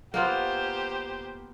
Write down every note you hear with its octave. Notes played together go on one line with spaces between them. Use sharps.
A#3 B3 F4 G4 C5